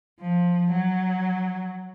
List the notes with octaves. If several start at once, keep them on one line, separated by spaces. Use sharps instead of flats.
F3
F#3